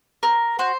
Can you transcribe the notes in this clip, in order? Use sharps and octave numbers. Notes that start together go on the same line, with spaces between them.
C4 A#4
F#4 C5